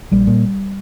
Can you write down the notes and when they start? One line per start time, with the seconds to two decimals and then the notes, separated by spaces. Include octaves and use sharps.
0.11 A#1 G3
0.27 A#2